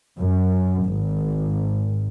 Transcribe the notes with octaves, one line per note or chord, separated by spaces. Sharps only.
F#2
G#1